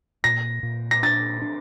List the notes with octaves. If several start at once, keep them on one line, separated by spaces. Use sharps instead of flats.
A#2 A#6
A#2
A#6
D4 A6
D4